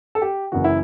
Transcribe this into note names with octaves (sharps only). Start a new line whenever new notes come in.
A4
G4
F#1 F#2 E3 F#4
E4